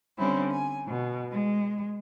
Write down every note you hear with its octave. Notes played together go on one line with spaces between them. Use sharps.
D3 G3 C4 C#4 E4
G#5
B2
G#3